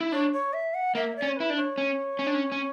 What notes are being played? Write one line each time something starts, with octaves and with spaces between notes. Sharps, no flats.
E4
D4 C#5
C#5
E5
F#5
A#3 E5
D5
C#4
C#5
E4 B4
D4
C#5
C#4
C#4
D4
C#4
C#4